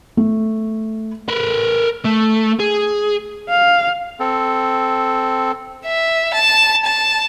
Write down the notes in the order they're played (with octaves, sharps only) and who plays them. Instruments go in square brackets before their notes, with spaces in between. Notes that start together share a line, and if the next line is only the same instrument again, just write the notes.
[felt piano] A3
[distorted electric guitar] A#4 B4
A3
G#4
[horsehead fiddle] F5
[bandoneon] C4 A4
[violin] E5
A5
A5